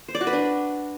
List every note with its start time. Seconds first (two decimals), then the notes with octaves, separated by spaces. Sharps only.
0.08 C5
0.15 D5
0.21 F#4
0.27 B4
0.33 D4